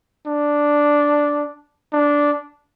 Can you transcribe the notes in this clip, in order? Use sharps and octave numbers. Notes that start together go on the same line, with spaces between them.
D4
D4